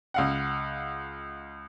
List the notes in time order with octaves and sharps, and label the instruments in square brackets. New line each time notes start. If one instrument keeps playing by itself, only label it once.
[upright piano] C#2 F5 F#5